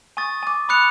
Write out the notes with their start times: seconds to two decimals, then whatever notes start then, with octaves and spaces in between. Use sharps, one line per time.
0.17 G#5 C#6 D#6 A6
0.43 G#5 D6
0.69 B5 D6 D#6 F#6 C#7 F7